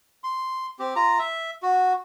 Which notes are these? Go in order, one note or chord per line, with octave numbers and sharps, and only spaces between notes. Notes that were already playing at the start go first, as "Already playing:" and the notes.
C6
C4 G4
F4 A#5
E5
F#4